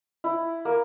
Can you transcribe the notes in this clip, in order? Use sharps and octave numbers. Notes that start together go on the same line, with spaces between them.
E4
A#3